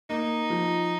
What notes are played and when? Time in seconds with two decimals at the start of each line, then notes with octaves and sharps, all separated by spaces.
0.10 A#3 D#4
0.50 F3